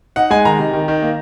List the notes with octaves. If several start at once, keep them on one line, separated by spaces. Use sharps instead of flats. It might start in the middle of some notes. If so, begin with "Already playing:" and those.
D#4 F#5
G#3 G#5
D#3 A#5
C3
D#3
D#3
A#3